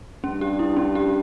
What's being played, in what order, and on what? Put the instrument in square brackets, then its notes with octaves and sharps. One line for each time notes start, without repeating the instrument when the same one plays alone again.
[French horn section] G2 [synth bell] C#4
[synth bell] G4
E4
C#4
G4